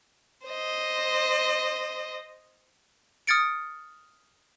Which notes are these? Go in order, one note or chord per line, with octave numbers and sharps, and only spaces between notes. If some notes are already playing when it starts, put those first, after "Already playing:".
C5 D#5
D#6 F6 G#6 A6 C#7 D7